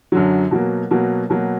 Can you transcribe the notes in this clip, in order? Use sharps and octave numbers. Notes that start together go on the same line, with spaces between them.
F#2 D3 F#3
B2 F#3 A#3
B2 F#3 A#3
B2 F#3 A#3